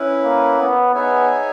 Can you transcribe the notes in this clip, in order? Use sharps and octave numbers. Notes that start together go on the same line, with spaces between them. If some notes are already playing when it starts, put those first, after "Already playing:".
Already playing: C#4 E4 B4
A#3
B3
B3 D#4 G#4 C#5 E5 G#5